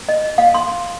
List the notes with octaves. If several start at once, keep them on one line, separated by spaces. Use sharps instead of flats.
D#5
F5
C6